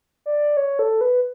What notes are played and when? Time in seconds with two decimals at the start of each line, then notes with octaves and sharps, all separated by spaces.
0.26 D5
0.57 C#5
0.79 A4
1.01 B4